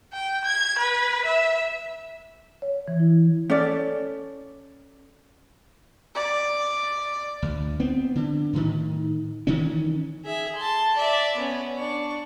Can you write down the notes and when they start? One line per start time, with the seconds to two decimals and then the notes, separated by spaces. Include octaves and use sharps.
0.13 G5
0.45 G#6
0.78 B4
1.25 E5
2.62 C#5
2.88 E3
3.00 E4
3.50 C#4 A4 D5
6.15 D5
7.42 D2
7.80 B3 C4
8.15 D3
8.53 A2 D#3
9.47 D#3 E3 C#4
10.24 G#4 E5
10.56 A5 C6
10.96 D5 E5
11.36 B3 C#4
11.78 D4 C#6